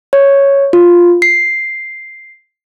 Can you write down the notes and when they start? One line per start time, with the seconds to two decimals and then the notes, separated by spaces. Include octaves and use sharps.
0.13 C#5
0.73 F4
1.22 C7